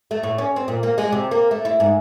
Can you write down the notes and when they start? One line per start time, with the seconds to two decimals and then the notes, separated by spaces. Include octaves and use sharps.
0.11 A3
0.23 A2
0.38 C#4
0.56 C4
0.68 A#2
0.83 A#3
0.98 G#3
1.12 C3
1.31 A#3
1.51 A3
1.65 E4
1.80 G#2